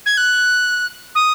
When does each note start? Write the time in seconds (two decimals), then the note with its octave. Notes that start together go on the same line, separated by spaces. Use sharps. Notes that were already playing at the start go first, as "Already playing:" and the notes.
0.06 G#6
0.17 F#6
1.15 D#6